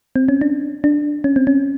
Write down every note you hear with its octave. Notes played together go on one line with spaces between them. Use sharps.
C4
C#4
D4
D4
C#4
C4
C#4